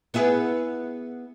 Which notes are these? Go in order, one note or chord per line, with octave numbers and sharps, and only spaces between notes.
B3 E4 G#4